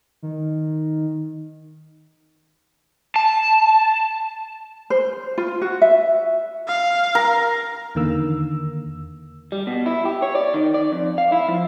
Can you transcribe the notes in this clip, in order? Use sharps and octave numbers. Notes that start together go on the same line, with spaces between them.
D#3
A5
C5
F4
F#4
E5
F5
A#4
E2 D3 D#3 A#3 E6
G3
B2
E4
G4
C#5
D5
D#3
D5
F2
F5
E4
F3